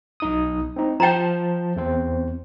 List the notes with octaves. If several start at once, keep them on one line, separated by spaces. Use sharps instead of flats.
B1 D#4 D#6
C4 D#4
F3 G5 A5 A#5 G6
E2 C4 C5